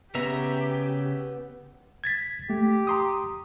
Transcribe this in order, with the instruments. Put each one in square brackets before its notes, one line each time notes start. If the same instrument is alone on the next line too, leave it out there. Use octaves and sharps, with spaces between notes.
[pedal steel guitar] C#3 E5 A#5 [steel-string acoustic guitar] B3 [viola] G4
[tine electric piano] G#6 A6 B6
[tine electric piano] A3 [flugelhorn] G4
[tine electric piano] A#5 C6 D#6